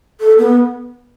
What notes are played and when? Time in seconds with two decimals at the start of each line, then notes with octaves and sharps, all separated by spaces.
0.20 A4
0.38 B3